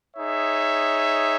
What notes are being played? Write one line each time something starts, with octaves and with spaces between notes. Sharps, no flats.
D#4 G#4 C#5 E5